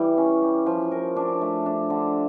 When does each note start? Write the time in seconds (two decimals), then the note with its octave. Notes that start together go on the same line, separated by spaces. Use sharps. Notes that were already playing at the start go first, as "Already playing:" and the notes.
Already playing: E3 G3
0.17 C#4
0.43 G4
0.66 F3
0.91 A#4
1.16 D4
1.41 A3
1.66 D4
1.90 D3